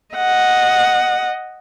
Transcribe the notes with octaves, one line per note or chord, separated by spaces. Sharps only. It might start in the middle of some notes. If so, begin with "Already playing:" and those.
D#5 F#5